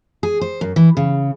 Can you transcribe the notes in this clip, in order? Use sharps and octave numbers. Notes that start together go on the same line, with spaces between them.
G#4
C5
F#2
E3
C#3